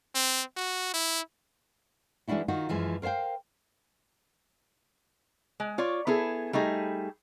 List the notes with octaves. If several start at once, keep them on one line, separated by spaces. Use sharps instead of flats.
C4
F#4
E4
E3 G#3 C#4 D4 E4 F#4
D#3 D#4 F4 F#4
F#2 E3 F3 G#3
A#4 C5 C#5 F5 G5
G#3
F4 C#5 D5
B3 E4 G#4 A4
G3 A3 D#4 G#4